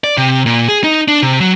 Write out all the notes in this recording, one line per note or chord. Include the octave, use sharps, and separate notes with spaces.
D5
C3
A#2
G#4
D#4
D4
C3
F#3